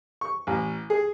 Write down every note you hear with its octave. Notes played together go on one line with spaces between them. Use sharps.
C#6
A1
G#4